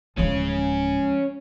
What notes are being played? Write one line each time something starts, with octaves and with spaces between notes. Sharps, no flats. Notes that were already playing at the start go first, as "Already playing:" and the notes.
D1 F3 G#3 C#4 G#4